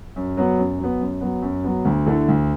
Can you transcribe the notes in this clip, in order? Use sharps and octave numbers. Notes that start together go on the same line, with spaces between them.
F#2
F#3 B3
F#2
F#3
B3
F#2
F#3 B3
F#2
F#3 B3
D2
D3 A3 E4
D2